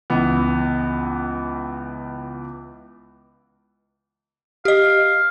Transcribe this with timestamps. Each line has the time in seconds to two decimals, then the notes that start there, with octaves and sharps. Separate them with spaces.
0.10 C#2 E3 B3
4.65 G4 D#5 F5